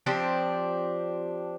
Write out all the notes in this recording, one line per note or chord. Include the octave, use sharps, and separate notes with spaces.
F3 C4 D4 G4